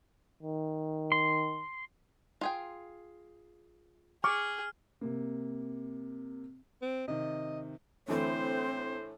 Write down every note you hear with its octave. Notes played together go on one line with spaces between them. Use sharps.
D#3
C6
F4 G#4 G5
G#4 C#6 D6 F6
C3 A#3
C4
C3 D#3 D#5
A2 D3 E3 A3 C4 C5